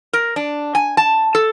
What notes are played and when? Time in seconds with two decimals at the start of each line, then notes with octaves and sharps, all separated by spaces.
0.13 A#4
0.36 D4
0.75 G#5
0.97 A5
1.35 A4